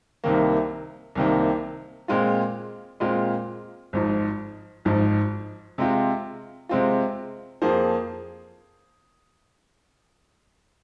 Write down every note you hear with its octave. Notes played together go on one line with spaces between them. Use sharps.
C2 C3 D#3 A#3
C2 C3 D#3 A#3
A#2 G#3 C4 F4
A#2 G#3 C4 F4
G#1 G#2 F3
G#1 G#2 F3
C3 G#3 C4 F4
C3 G#3 C4 F4
F2 F3 A#3 G#4 C5